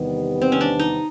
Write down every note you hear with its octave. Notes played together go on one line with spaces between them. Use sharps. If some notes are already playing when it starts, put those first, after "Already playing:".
Already playing: E2 C3 D#3 G3 B3
C4
C#4
D4
D#4